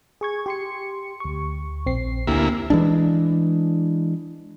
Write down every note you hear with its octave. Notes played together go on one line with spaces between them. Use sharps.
G#4 C#6 G#6
G4 C6 C#7
D2 C#6
A#1 C4 C7
D2 A#3 E4 G4 G#5
E3 G#3 D4